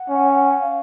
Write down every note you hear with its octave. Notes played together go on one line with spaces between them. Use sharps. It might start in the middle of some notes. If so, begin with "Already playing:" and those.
Already playing: F#5
C#4
F5